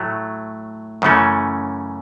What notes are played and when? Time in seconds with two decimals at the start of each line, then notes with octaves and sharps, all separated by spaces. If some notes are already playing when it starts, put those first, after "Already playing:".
Already playing: A2 F#3 A3
1.02 F#2 C#3 E3 A3 C#4